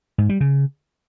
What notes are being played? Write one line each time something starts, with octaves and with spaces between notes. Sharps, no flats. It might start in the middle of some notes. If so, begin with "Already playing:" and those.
G#2
G3
C#3